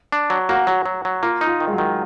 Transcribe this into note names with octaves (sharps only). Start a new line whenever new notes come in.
D4
F#3
A#3 F#4
F#3 F#4
F#3
F#3
A#3 F4
D#4
F4
D#3
G#3
F#3
D#3